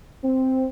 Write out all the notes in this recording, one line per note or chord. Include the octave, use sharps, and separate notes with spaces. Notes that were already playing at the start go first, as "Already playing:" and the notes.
C4